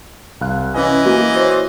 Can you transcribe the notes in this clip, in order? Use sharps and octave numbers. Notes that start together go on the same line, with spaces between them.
C2 F5 F#6
E3 C#4 B4 D#5 G#5
A#3 F#4
C5 C#5